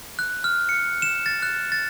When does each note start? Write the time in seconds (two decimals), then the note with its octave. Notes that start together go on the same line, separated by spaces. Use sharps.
0.19 F#6
0.44 F6
0.69 C#7
1.02 E7
1.26 A6
1.42 F#6
1.72 A6